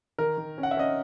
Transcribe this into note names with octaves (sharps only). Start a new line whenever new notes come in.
D#3 A#4
D#3
C#4
F#5
E5
C#4 D#5